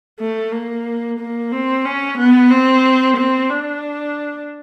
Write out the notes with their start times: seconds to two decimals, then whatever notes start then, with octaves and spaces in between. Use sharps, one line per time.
0.19 A3
0.52 A#3
1.19 A#3
1.52 C4
1.85 C#4
2.18 B3
2.50 C4
3.17 C4
3.50 D4